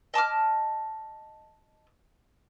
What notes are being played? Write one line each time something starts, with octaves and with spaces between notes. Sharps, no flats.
D#5 A5 D6 F6